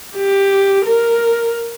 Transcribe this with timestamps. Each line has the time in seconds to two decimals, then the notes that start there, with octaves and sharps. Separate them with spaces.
0.16 G4
0.85 A#4